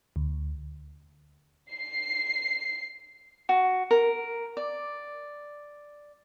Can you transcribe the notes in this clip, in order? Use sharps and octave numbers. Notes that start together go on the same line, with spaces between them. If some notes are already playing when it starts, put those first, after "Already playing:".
D2
C7
F#4
A#4
D5